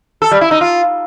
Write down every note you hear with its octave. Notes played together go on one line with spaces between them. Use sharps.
A4
G3
E4
D#4
F4